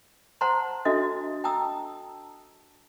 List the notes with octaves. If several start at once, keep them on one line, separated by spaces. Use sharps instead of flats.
C5 F#5 A5 A#5 C6
D4 F#4 A4 D#5 E5
G5 A5 A#5 D#6 E6